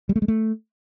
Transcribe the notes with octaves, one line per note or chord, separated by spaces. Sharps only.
G3
A3
G#3
A3